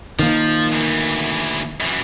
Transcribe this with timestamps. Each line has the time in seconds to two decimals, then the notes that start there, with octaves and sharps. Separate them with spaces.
0.19 D#3 F3 A#3
0.72 D2 E3
1.80 F#2 E3